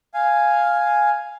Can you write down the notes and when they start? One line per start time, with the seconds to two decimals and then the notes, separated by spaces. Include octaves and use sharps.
0.14 F5 G#5